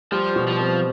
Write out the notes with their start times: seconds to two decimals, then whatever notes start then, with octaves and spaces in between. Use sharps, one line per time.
0.12 F3 G3
0.36 B2
0.47 F3
0.60 C4